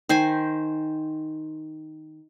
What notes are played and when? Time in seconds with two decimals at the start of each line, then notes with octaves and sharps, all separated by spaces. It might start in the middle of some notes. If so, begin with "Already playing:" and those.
0.09 D#3 C5 G#5